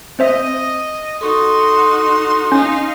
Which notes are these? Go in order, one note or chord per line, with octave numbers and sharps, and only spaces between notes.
C4 C5 D#5 E5
D#4 F#4 A4 C6 C#6 D#6
C#4 D#4 F5